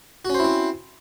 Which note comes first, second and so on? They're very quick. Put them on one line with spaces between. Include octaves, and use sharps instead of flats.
F#4 C#4 C5 E4 C4